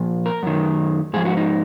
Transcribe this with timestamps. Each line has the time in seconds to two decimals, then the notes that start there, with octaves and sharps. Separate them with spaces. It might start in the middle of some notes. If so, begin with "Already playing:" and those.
Already playing: A#2 F3
0.26 A#4
0.43 F#2 D#3
1.13 G#2 F3 G#4
1.25 F#4
1.37 D#4